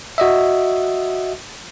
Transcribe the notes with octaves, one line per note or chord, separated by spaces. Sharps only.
F#4 D#5 E5